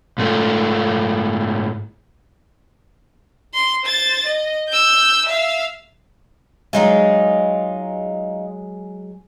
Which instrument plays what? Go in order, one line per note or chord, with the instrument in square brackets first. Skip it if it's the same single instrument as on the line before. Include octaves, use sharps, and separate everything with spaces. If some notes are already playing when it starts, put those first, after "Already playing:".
[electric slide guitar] G#2 A3 F4
[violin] C6
C5 A6
D#5
E6 G6
E5 F5
[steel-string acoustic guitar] F#3 G#3 G#4 [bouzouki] D#4 F4